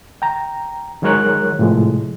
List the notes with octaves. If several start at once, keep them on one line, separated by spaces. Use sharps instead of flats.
G5 A#5
D#3 F#3 G#3 A#4 C#5 F#6
A2 C3 F3 G#3